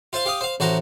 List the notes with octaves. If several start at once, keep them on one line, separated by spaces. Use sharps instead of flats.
F4 C5 F5
G4 F5 D#6
C5 F5
A1 F#4 C5 A5 A#5